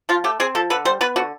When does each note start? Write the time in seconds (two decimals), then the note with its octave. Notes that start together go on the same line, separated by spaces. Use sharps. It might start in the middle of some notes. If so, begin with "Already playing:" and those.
0.09 F3 F4
0.24 A3 G4
0.40 C4 G#4
0.55 F3 A4
0.70 D3 B4
0.85 G3 C5
1.01 B3 B4
1.16 D3 F#4